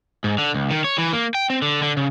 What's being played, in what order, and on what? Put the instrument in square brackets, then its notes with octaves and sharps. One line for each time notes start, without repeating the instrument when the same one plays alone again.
[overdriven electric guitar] G#2
D3
C#2
D#3
C#5
E3
A#3
G5
C4
D3
D3
C#3